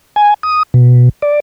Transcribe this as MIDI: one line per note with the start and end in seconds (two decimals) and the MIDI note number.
0.16 0.34 80
0.43 0.63 87
0.74 1.09 47
1.22 1.40 74